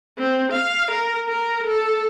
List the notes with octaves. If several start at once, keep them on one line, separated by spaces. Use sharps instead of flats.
C4
F5
A#4
A#4
A4